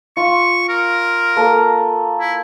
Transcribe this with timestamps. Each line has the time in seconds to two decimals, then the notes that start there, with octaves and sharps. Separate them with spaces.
0.17 F4 C#6
0.69 A#4
1.37 A#3 A4 D#6
2.20 E4